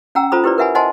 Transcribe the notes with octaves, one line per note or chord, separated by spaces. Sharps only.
C#4 F#5 G5 A#5 E6
F4 A4 C5 A#5 B5 D#6
E4 G4 B4 C5 D5
A#4 B4 E5 F#5 G#5 B5
C5 D#5 F#5 G#5 A5 C6